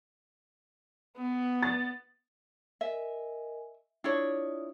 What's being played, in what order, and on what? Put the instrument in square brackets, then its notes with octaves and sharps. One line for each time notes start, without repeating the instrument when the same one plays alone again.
[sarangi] B3
[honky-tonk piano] A6
[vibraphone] A#4 D#5 G#5 [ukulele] E5
[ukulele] D4 E4 C#5 [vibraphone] F4 D5 D#6